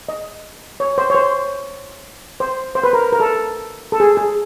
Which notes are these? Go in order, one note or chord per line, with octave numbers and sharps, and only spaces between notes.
D#5
C#5
C5
C#5
C5
C5
C5
B4
A#4
A#4
A4
A4
G#4
G#4